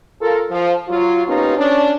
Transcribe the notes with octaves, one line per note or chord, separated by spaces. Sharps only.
F4 A4 A#4
F3
F#3 F4
A#3 B3 C#4 D#4 F4 G4
C#4 D4